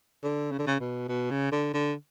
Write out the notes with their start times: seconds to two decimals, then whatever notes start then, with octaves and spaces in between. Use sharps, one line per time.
0.23 D3
0.52 C#3
0.59 D3
0.67 C#3
0.80 B2
1.09 B2
1.30 C#3
1.52 D3
1.74 D3